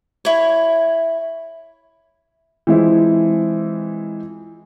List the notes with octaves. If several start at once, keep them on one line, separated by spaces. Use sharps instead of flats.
E4 C#5
E3 F3 G#3 C4 E4